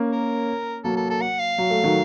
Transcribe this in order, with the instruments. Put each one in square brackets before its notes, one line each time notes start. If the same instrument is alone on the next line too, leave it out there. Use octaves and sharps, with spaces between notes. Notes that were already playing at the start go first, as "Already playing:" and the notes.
Already playing: [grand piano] A#3 C#4
[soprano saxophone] A#4
[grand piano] F#3 A#3 [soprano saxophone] A4
[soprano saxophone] A4
A4
F#5
F5
[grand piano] F#3
A3
D#3 F#3